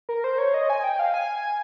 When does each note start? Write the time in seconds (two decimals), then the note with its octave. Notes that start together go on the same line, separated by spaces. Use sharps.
0.09 A#4
0.24 C5
0.38 C#5
0.54 D#5
0.70 G#5
0.84 G5
0.99 F5
1.14 G#5